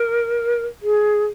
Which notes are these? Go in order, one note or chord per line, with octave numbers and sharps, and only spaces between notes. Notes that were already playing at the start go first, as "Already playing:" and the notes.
Already playing: A#4
G#4